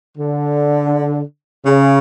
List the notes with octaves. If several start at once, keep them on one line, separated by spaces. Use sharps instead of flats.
D3
C#3